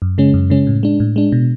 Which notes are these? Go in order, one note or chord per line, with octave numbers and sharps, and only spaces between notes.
F#2
C#3 G#3 C#4
F#2
C#3 G#3 C#4
A2
G#3 D4
A2
G#3 D4
B2